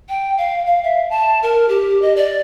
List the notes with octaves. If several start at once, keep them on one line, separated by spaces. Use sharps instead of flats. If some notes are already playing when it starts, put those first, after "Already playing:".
G5
F5
F5
E5
A5
A#4
G4
D#5
D5